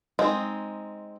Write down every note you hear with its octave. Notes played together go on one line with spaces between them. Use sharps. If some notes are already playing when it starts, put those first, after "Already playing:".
G#3 C4 D#4